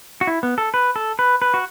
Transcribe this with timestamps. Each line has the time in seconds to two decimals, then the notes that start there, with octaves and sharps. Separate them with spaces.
0.21 F#4
0.27 E4
0.43 B3
0.58 A4
0.74 B4
0.96 A4
1.19 B4
1.42 B4
1.54 F#4